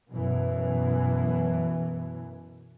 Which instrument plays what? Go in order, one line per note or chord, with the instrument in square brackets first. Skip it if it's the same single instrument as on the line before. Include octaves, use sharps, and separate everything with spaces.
[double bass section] F#2 B2 E3